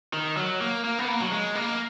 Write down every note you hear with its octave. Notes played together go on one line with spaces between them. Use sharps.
D#3
F#3
A#3
A#3
B3
A#3
F#3
G#3
A#3